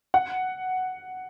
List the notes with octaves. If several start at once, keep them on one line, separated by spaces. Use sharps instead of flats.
F#5